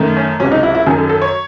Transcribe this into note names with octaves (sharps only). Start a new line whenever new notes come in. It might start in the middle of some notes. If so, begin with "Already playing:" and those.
Already playing: F#2 D#3 A3
C#4
C#2 C3 F#3 C#4
D#4
E4
E4
F#2 D#3 F#3 G#4
A4
A4
C#5